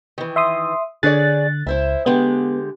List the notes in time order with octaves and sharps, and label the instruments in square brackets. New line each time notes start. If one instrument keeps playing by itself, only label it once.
[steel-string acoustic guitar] D#3 E3
[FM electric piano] E5 C6 D#6
[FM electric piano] D3 F#6 A6 [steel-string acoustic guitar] G#4 C#5 D5
[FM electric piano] C#2 [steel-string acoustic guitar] E4 C5 E5
[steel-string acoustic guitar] D3 G#3 G4 [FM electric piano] B3